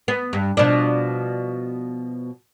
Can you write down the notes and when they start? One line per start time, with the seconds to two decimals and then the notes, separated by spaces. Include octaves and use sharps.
0.08 B3
0.33 G2
0.57 B2 F3 D4